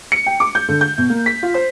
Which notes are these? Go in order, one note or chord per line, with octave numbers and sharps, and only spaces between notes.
C#7
G5
D6
G6
D3
G6
B2
A#3
B6
F4
C5